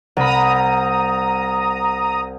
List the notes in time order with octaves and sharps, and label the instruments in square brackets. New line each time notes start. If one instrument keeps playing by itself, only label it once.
[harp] C2 B5 [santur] F#5 [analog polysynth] A#5 D#6